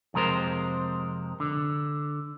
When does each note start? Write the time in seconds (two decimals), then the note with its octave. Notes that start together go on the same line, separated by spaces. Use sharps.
0.14 F2 C3 G#3 A#4 C5
1.40 D3